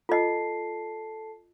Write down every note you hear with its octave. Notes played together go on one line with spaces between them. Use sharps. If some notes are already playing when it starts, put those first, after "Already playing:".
F4 A4 D#5 A5 C7